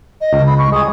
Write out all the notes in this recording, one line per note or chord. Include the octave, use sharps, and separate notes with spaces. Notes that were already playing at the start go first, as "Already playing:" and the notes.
D#5
C#2
B5
C#6
G#3 G#4 D#6